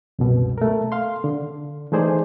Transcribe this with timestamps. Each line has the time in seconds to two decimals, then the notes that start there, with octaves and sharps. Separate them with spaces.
0.19 C2 F#2 B2
0.58 A3 A#4
0.92 F5 C6
1.24 D3
1.92 E3 A3 D#4 G#4 C5 D5